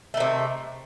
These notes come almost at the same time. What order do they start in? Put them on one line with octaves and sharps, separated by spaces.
A3 D#3 C3